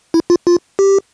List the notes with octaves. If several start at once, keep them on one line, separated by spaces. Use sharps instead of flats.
E4
F4
F4
G4